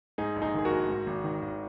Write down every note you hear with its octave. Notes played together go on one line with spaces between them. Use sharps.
G#2 D#4 G#4
A#1
D#4 G#4
D#3 G#4
F#4 A#4
A#1
G#2
G#1
D#3
G#1